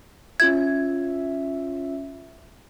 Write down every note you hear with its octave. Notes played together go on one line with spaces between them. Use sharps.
C#4 F4 E5 G#6